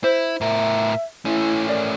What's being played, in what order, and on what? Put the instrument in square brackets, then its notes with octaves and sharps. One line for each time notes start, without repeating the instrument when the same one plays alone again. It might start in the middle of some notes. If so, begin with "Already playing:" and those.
[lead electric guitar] E4 [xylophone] C5
[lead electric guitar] A2 A#4 [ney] E5
[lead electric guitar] A3 C#4 [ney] E4
[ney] A#4 [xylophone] D5